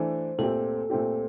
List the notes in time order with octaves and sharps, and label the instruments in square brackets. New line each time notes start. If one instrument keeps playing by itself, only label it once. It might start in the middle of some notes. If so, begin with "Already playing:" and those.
Already playing: [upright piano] E3 A3 D4 [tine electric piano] C5
[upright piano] A#2 A3 C4 G4 [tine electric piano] A4
[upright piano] A#2 A3 C4 G4